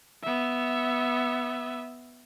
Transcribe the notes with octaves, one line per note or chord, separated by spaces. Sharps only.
B3 E5